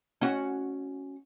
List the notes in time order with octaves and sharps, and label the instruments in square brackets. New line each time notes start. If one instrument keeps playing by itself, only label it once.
[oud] C#4 F#4